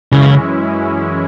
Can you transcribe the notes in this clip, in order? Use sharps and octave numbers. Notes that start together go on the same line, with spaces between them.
F#2 C#3 E3 G#3 C#4 E4